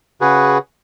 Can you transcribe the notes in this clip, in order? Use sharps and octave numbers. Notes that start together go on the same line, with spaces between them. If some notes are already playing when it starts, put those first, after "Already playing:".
C#3 F#4 G#4 B4